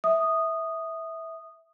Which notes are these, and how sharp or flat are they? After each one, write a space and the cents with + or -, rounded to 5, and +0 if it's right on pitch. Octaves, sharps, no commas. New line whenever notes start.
E5 -15 D#6 -10